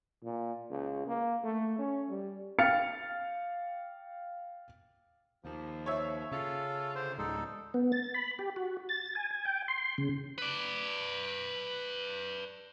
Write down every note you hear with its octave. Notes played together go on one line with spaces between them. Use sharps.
A#2
C#2
A#3
A3
C#4
G3
F5 G5 F6 A6 C#7
D#2 F3
C#5 E5
C#3 F4 A4
D3 C5
D1 G#3 D#4 A4
B3
A6
B5
G4
F#4
A6
G#5
G#5
G5
C6
C#3
B4 D5